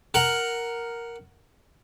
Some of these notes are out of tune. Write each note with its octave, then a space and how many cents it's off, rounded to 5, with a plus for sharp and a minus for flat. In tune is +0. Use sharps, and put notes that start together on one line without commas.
A#4 +0 F#5 +5